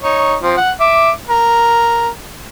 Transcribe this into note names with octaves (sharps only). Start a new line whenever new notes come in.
D#4 C#5
F3 C4
F#5
E5 D6
A#4